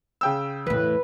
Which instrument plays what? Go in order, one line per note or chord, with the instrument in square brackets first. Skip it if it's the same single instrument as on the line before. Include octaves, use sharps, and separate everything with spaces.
[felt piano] C#3 G5 E6
[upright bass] E2 A2 [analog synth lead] B4